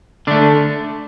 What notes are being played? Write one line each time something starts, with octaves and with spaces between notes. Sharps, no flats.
D3 A3 D4